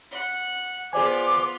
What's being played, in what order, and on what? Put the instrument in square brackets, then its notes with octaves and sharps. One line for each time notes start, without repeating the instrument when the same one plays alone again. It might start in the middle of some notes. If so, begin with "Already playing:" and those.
[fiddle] F#5
[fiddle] B3 F4 [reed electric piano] G#4 D5 G#5 [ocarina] C5 [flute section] D6